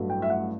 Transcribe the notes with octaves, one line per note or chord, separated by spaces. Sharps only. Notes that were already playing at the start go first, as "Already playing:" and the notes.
Already playing: A1 G2 F#3 A3
G5
E5
F#5